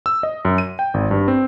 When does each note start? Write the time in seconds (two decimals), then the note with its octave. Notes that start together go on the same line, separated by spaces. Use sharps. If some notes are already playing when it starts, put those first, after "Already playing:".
0.06 E6
0.23 D#5
0.45 F#2
0.58 D#7
0.79 G5
0.94 G#1
1.11 G2
1.28 C4